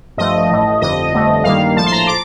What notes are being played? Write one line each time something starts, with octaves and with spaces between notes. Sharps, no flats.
G2 F3 A3 D#5
A1 A2 A3
G1 F2 D3 D#5
G1 F2 D3 A3
G2 D#3 G3 A#3 F5
A#1 A2 F3 A5
C6
A#5
D6